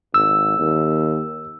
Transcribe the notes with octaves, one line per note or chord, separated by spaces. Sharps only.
G#1 E6
D#2